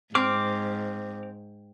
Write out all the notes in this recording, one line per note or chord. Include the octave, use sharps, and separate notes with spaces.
G#2 C4 D6 F6